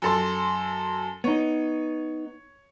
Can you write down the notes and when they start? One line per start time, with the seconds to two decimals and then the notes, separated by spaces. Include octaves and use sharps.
0.02 F#2 A4 C6
1.24 B3 D#4 C#5